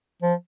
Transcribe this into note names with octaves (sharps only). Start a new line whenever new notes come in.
F3